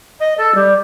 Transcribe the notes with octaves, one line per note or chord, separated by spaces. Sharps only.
D#5
A4
G3